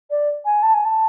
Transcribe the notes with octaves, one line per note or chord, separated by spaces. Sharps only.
D5
G#5
A5
G#5
A5